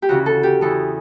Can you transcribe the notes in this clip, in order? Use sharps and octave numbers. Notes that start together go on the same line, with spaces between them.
G4
D2 C#3 E3 F#4
A4
G4
E2 C#3 E3 A4